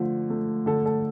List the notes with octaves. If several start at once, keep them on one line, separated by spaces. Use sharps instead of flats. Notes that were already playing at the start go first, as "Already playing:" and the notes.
Already playing: D3 F3 A3
A3
D3 A4
A4